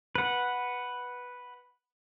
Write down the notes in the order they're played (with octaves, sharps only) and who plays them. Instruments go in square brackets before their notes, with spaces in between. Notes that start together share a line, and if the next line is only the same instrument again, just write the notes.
[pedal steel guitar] B4 F#5